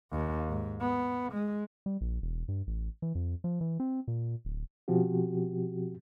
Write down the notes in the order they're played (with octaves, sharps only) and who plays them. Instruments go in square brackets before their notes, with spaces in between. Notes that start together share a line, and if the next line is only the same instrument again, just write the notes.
[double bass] D#2
G#2
B3
G#3
[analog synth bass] G3
A#1
E1
G2
A1
E3
F2
F3
E3
C4
A#2
D1
[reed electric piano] B2 F3 C4 F#4 G4